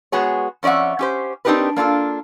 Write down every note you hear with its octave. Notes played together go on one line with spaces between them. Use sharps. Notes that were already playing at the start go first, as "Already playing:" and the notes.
G#3 B3 F#4 G#4 C#5
F2 C#4 D5 E5 F#5
C#4 G4 C5
C4 D4 D#4 G4 A#4 B4
A#3 D4 F4 A4